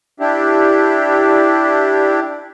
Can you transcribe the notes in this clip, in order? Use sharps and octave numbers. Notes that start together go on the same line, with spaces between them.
D4 E4 G4